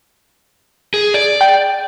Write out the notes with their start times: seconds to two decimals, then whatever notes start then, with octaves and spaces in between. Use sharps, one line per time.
0.94 G#4
1.14 D5
1.41 G5